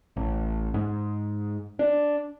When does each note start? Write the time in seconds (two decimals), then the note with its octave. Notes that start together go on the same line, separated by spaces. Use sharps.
0.16 A1
0.74 G#2
1.79 D4